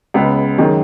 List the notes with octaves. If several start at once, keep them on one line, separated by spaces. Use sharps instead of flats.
C#2 C#3 G#3 B3
F#2 D#3 G#3